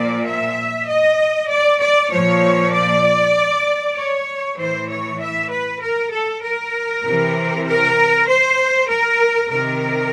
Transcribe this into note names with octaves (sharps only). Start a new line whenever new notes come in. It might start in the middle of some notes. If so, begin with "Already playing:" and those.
Already playing: A#2 F3 D5
E5
D#5
D5
D5
A#2 F3 C#5
D5
C#5
A2 E3 C5
C#5
E5
B4
A#4
A4
A#4
C3 E3
A#4
C5
A#4
C3 D#3 A#4